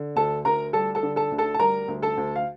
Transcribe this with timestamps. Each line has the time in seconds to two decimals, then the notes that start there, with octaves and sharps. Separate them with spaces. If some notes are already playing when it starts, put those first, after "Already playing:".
Already playing: D3
0.16 D2 A4 A5
0.45 D2 A#4 A#5
0.73 G3 A4 A5
0.95 A4 A5
1.03 D3
1.16 A4 A5
1.31 D2
1.38 A4 A5
1.54 A5
1.59 G3 A#4 A#5
1.88 D2
2.02 A4 A5
2.17 D2
2.36 F5